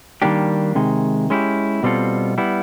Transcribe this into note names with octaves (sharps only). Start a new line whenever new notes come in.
D#3 G3 A#3 D4 G4
C3 D#3 G#3
G#3 C#4 E4 G4
B2 G3 C4 F4 A4
G3 B3 E4